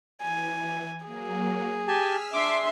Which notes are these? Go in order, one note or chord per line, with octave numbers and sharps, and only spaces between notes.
E3 G#5
F#3 A#3 G#4
G4 G#5 A5 E6 F6 B6
D4 E5 C6 D6